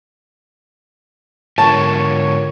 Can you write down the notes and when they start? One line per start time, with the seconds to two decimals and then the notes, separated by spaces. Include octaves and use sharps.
1.58 G#2 D3 F4 A#4 C#5 A5 C#6